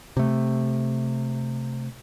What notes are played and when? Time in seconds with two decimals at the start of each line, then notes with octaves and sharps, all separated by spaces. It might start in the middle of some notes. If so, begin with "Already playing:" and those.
0.17 C3 A3